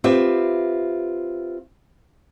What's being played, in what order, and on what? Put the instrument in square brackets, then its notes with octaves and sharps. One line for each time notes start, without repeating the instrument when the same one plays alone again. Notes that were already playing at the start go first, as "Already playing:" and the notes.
[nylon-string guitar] C4 F4 G4 B4 E5